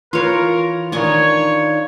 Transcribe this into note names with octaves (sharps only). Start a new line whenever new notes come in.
E3 F4 A#4 B4 C#5
D#3 D4 F4 C#5 D#5 G#5